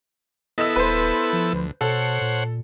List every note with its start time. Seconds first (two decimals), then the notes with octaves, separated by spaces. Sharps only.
0.58 B3 E4 A4 D#5 E6
0.76 D#1 B4 C5
1.33 F3
1.53 D2
1.81 B2 A4 C5 C#5 F#5
2.21 A#2